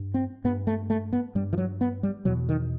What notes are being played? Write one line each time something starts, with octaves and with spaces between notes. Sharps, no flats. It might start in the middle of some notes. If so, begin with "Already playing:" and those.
Already playing: G2
C4
G2 B3
A3
A3
B3
G2 G3
E3
F#3
B3
G3
E2 B2 F#3
D#3